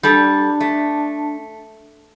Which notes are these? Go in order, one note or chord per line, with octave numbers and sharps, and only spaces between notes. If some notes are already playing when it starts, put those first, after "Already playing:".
G3 D4 A4
A3